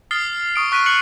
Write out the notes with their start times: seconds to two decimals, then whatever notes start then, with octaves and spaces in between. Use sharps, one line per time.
0.11 D#6 F6 A6 C7 G7
0.56 C#6 D#6 D7
0.72 C#6 F#6 B6 D7 D#7
0.86 F#6 C#7 F#7